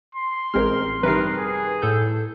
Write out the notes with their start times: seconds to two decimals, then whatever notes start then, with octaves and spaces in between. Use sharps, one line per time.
0.15 C6
0.54 A1 G#3 C4 A#4 F6
1.03 G2 C3 D#3 A#4 B4 C7
1.37 G#4
1.82 A2 A4 G6